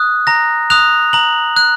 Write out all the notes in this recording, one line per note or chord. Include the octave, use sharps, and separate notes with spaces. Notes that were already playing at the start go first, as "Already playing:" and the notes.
Already playing: D#6 F#6
A#5 A#6
D#6 F#6 F7
A#5 F#7
F#6